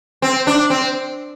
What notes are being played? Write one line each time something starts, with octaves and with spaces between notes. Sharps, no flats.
C4
D4
C4